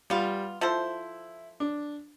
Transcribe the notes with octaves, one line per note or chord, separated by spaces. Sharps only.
G3 B3 F4
F3 E4 A4 C5
D4